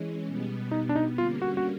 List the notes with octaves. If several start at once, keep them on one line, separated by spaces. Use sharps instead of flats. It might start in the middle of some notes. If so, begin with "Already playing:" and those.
Already playing: E3 G#3 C#4
B2 G3 B3
D#4
D4
D#4
D3 G3 A#3 C#4 F4
F#4
F#4